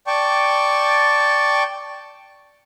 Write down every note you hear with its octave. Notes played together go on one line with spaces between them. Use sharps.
D5 G5 A5 C#6